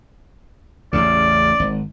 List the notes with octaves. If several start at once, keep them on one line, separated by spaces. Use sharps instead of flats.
A1 E2 C#3 D5
G#1